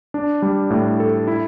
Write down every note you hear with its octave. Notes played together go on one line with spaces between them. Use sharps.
D4
G3
A2
A4
E4